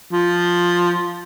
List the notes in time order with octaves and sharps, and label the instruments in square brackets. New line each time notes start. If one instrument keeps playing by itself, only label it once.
[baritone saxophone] F3